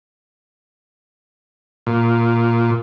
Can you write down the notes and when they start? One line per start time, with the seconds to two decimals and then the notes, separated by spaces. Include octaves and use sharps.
1.87 A#2